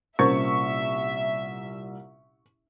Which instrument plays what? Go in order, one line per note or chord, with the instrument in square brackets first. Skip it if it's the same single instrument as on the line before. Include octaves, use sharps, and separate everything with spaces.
[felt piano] C2 A#2 [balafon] C#4 A#4 C5 [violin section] E5 [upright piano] C#6